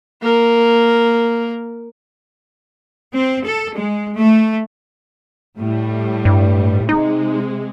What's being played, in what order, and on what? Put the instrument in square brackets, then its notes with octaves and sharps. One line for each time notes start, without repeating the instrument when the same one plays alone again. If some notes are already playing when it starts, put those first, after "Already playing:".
[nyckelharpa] A#3 A#4
[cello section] C4
A4
G#3
A3
[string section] A2 G3
[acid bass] G2
[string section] C3 G#3 [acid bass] D#4